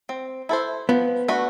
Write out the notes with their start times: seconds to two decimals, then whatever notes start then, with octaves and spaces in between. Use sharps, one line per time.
0.09 C4
0.49 E4 A4 C5
0.89 F3 B3
1.28 A3 D4 F#4 B4